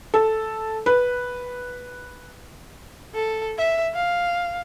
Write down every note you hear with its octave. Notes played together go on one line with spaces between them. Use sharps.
A4
B4
A4
E5
F5